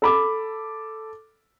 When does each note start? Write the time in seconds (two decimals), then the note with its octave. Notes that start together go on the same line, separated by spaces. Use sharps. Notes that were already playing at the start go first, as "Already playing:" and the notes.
0.02 A4 B5 D6